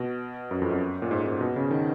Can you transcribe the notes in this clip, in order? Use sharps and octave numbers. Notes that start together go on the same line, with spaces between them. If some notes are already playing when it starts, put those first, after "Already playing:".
Already playing: B2
F#2
F2
F#2
A#2
G#2
G#2
B2
C#3
D#3